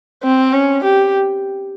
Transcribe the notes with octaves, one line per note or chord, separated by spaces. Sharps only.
C4
C#4
G4